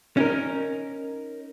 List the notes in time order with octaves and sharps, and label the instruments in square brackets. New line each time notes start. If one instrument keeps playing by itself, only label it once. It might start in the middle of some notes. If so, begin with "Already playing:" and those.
[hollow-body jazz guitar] C#4 D#4 A#4